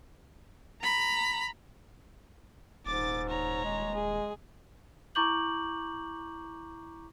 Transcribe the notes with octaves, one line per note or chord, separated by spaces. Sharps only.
A#5 B5
D#1 G#2 D6 A6
C#5 A#5
G#3
G#4
E4 A#5 C#6 D6 G6 F#7